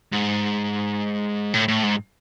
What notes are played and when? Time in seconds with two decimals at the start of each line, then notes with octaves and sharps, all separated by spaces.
0.13 G#2
1.54 A2
1.68 A2
1.83 G#2